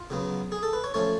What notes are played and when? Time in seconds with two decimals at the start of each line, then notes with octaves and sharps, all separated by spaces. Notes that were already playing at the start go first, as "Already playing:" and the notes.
Already playing: F4
0.10 C#3 F#3 B3
0.52 G#4
0.63 A4
0.73 B4
0.84 C#5
0.94 F3 A3 C#4 C#5